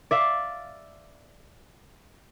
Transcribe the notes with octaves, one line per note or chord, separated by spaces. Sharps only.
D5 E5 F5